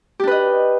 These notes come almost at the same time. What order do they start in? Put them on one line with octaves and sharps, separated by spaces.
G4 D4 B4 D#5